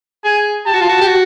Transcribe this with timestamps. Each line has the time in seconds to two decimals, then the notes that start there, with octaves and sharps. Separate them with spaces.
0.24 G#4 G#5
0.66 G4 A5
0.74 F#4
0.81 F4
0.89 F#4
1.01 G4
1.07 F#4